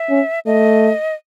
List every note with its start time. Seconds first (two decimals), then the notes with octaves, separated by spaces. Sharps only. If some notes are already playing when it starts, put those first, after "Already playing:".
Already playing: E5
0.09 C#4
0.46 A3 D#5